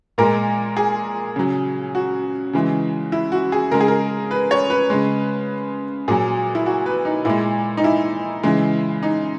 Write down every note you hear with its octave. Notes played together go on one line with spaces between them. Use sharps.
A#2 G#3 A#4
G#4
C#3 F#3
F#4
C#3 E3 G#3
E4
F#4
G#4
C#3 G#3 A#4
G#4
A#4
B4
C#5
B4
C#3 G#3
A#2 F#3 G#4
E4
F#4
B4
D#4
A#2 G#3 E4
D#4
E4
C#3 E3 G#3
D#4